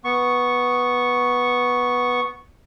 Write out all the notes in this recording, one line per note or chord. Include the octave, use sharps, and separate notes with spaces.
B3 C#6